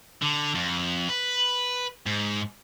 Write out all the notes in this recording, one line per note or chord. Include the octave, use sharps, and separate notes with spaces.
D3
F2
B4
G#2